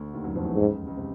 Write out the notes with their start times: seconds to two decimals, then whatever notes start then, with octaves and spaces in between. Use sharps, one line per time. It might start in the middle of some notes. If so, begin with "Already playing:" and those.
Already playing: D2 D3
0.14 D#2 D#3
0.24 F#2 F#3
0.35 F2 F3
0.45 E2 E3
0.56 G#2
0.66 C#2 C#3
0.87 C#2 C#3
0.97 C3